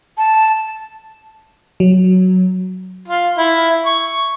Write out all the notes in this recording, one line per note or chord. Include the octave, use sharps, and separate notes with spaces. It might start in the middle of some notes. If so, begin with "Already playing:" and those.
A5
F#3
F4
E4
C#6